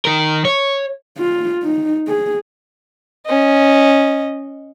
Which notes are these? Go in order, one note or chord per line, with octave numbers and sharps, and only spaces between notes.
D#3 A#4
C#5
F4
D#4
G#4
C#4 D#5